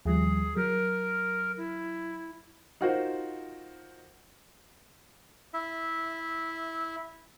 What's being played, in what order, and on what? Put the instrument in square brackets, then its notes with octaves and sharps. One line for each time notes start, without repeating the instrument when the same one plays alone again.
[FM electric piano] D#2 F3 G3 [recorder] G#4
[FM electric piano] F#3 [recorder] A#4
[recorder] E4
[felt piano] D#4 F4 F#4 A#4 C5
[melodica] E4 E5